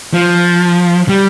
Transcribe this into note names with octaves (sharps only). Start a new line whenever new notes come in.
F3
G3